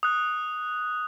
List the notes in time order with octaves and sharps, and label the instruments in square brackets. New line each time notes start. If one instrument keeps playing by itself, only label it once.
[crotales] D#6 F#6